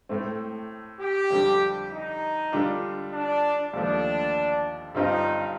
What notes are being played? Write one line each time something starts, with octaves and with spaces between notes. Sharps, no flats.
A2 A3 C4
G4
F2 D3 G3
D#4
D3 G3 D4 F4
D4
D#2 D3 F3 A3 D4
G2 D3 G3 C4 D#4 F4